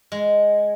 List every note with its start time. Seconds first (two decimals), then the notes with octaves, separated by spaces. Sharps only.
0.12 G#3